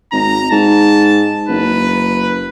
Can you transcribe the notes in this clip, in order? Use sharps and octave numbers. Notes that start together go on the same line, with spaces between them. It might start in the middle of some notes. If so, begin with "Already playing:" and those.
G#1 A#5
G#2 A5
F#1 B4